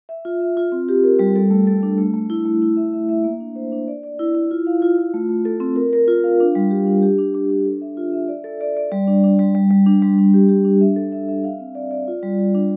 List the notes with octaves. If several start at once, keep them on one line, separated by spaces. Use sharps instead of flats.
E5
F4
E5
F4
C4
G4
A#4
G3
A4
A3
A4
D4
A3
A3
E4
A3
E4
E5
E5
E5
A#3
D4
C5
D4
D5
D5
E4
E4
F4
F5
F4
F4
A3
A3
A4
C4
A#4
A#4
F4
F5
D4
G3
G4
D4
G4
D4
D4
D4
A4
E5
F4
E5
D5
A4
D5
D5
G3
D4
D4
G3
G3
G3
D4
G3
D4
G4
G4
D4
E5
A4
E5
E5
F5
C4
D5
D5
F4
G3
F4
D4